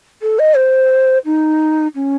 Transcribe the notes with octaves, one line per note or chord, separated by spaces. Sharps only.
A4
D#5
C5
D#4
C#4